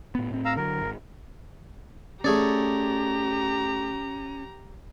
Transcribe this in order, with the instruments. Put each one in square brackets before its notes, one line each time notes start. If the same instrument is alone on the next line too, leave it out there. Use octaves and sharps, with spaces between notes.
[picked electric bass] A2 B3
A2 C4
[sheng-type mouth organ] F5 A#5 E6
[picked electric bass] D3 F#3 [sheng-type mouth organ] A#4
[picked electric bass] G#1
[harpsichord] A3 G#4 D5 [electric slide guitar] C#4 [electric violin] G4 A#5